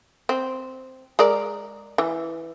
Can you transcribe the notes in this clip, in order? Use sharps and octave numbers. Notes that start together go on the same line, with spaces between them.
C4
G#3 A#4 D5
E3